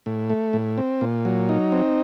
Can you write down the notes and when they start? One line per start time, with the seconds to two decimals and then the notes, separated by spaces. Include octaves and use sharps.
0.06 A2
0.30 A3
0.53 A2
0.78 C4
1.01 A#2
1.25 F#3
1.49 D#4
1.72 C4